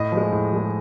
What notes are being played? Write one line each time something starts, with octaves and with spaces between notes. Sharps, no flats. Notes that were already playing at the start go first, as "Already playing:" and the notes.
Already playing: A2 D#5
F3
G#3
A2
F3 G#3